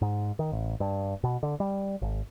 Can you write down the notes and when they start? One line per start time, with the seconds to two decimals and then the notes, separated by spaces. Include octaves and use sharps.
0.02 G#2
0.39 D#3
0.52 A1
0.80 G2
1.24 B2
1.43 D3
1.60 G3
2.02 G#1